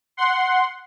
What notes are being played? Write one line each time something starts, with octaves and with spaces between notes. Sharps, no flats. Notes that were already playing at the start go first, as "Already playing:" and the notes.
F#5 C6